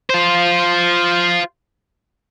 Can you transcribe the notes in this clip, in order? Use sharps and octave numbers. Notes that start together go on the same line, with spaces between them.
F4 C5